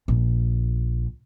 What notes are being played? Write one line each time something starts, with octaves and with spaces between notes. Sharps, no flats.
A#1